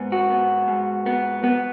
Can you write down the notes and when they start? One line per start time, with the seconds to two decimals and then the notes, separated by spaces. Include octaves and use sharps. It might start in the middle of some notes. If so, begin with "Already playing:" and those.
Already playing: G#2 B3
0.12 F#4
0.30 B3
0.68 G#2
1.06 B3
1.44 B3